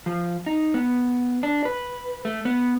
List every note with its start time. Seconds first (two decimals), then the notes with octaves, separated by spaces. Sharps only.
0.06 F3
0.46 D#4
0.74 B3
1.43 D4
1.65 B4
2.25 A3
2.45 B3